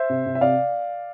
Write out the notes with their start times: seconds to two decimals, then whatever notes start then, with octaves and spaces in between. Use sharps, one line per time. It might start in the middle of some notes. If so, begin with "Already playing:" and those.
Already playing: C5 E5
0.09 C3
0.26 C3
0.35 E5
0.41 C3 D5 F5